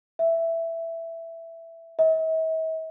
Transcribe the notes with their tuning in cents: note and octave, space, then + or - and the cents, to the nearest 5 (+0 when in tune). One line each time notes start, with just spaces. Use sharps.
E5 +5
E5 -45